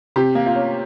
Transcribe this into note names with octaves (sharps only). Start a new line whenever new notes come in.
C3 G4
A#3
F4
C#4